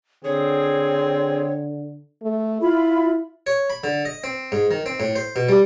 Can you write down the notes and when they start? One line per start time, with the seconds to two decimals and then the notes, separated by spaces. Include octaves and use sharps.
0.24 D3 C4 G#4 C#5
2.22 A3
2.61 E4 F4 B5
3.47 C#5
3.70 B5
3.84 D3
4.05 D#5
4.24 C4
4.52 G#2
4.71 D#3
4.86 C4
5.00 A2
5.16 C5
5.36 B2
5.49 G3